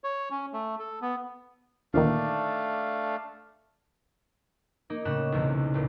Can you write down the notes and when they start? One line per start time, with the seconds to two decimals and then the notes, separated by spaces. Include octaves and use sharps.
0.04 C#5
0.31 C#4
0.53 A3
0.79 A4
1.02 B3
1.94 D2 A#2 D#3 A3 D4 F5
4.90 A#3 D#4
5.05 A2 C#3 D#4 F#6 E7
5.32 B1 E2 C3
5.74 C#2 A#2